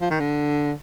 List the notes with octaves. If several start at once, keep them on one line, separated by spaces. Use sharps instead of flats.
F3
D#3
D3